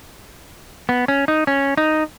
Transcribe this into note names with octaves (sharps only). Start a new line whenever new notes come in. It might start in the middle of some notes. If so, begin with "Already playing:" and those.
B3
C#4
D#4
C#4
D#4